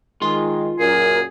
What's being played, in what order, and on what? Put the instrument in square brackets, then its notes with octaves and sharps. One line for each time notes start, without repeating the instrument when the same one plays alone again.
[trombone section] D#3 G#3 [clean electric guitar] F4 C6
[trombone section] F#2 A#2 [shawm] G#4 [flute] A#4